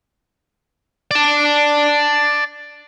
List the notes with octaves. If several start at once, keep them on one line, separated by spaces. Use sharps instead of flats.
D5 A5